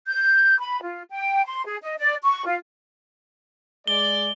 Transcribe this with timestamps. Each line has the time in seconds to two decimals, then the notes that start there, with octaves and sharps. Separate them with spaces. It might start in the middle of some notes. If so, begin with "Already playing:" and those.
0.06 G6
0.58 B5
0.82 F4
1.09 G5
1.45 C6
1.66 G#4
1.82 D#5
1.97 D5
2.24 C#6
2.45 F4
3.87 G#3 D5 G7